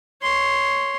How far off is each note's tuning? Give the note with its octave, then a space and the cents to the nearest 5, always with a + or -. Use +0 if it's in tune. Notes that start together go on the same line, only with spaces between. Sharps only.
C#5 +0 C6 +0